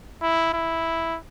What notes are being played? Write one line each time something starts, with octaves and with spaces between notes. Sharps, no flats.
E4
E4